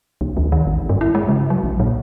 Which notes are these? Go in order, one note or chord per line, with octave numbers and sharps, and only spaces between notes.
C2
D#2
D#3
A1
G2
E4
G#3
C#3
F#3
B1
A#2